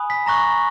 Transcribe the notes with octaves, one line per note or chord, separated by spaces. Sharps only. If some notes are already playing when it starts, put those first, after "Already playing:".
Already playing: G#5 B5 D#6 F#6
B6
A#5 C#6 F#6 A#6